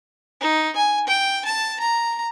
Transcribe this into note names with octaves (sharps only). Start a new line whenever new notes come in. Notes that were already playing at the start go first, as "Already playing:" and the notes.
D#4
G#5
G5
A5
A#5